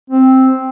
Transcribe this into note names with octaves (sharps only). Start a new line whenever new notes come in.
C4